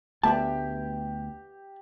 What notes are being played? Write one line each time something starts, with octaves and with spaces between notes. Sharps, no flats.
D2 A3 B3 G4 B4 E5 A5